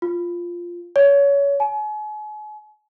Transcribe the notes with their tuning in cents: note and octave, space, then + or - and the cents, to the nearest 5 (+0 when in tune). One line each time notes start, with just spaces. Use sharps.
F4 -5
C#5 +25
G#5 +40